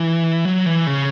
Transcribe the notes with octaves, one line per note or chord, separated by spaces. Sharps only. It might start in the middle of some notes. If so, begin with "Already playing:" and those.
Already playing: E3
F#3
E3
C#3